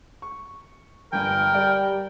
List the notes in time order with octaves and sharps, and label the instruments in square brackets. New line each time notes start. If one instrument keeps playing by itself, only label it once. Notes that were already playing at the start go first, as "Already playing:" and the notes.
[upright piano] C#6
[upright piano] G1 G2 G#5 [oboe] A#4 [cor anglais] G5
[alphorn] G3 [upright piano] D5